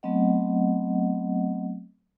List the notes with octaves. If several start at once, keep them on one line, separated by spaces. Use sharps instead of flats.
F#3 A3 B3 C4 D#5 F#5